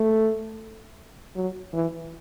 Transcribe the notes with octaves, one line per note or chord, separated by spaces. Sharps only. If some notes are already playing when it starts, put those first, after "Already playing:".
Already playing: A3
F#3
E3